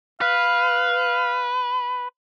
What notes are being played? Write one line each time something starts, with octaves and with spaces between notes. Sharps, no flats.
B4 F5